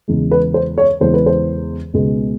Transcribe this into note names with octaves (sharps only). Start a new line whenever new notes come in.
E2 C#3 E3 G#3
B4
C5
C#5
E2 C#3 E3 G#3 C5
B4
C5
C#2 B2 G#3 B3